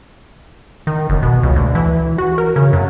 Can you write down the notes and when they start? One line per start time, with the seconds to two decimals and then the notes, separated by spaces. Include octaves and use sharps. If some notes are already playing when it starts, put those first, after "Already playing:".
0.87 D#3
1.09 F#1
1.23 B2
1.43 C#2
1.56 D2
1.75 E3
2.18 F#4
2.38 A#4
2.56 C#3
2.73 F#2